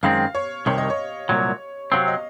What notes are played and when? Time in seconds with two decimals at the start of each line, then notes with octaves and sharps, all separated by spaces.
0.03 F#2 D#3 G#3 C4 F5
0.35 C#5
0.66 C2 C3 D#3 C#5
0.78 D#5
0.90 C#5
1.29 C2 A#2 F#3
1.92 C3 F#3 C4 F5
2.08 D#5